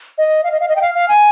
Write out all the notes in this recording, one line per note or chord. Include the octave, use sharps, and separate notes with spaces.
D#5
F5
D#5
F5
D#5
G5
F5
F5
G#5